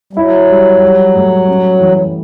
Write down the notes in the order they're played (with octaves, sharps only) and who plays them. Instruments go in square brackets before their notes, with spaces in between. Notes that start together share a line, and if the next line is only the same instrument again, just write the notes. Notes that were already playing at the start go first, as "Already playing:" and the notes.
[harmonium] G3
[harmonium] F#3 [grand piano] E4
[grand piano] G3
G3
A2
C#4
E3